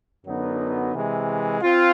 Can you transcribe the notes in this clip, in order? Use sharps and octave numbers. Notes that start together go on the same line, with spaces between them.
F#2 D3 F#3 B3 D#4
C3 E3 G#3
C4 F4